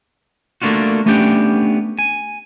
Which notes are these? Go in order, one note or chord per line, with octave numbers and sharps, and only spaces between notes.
A3 A#3 D4 F4 F#4
A3 B3 C#4 D4 G4 G5
G#5